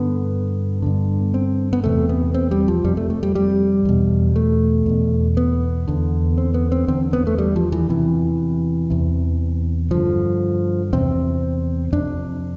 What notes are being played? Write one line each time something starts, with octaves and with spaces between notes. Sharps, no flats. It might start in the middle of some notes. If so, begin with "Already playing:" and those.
Already playing: G2 D3 B3
G2 D3
C4
B3
E2 C3 A3
B3
C4
G3
F3
F2 C3 G3
A3
A3
G3
G3
E2 B2
A3
E2 B2
B3
E2 D3
C4
B3
C4
E2 D3 C4
B3
A3
G3
F3
E3
E2 C3 E3
E2 C3
G2 D3 F3
E2 C3 C4
F2 C3 D4